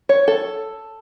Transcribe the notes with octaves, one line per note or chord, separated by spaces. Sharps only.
C#5
A4